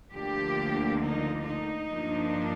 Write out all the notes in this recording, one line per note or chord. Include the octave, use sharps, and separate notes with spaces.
D2 D3 F3 A#3 D4 G4
D#4
D#4
G2 F3 A#3 D4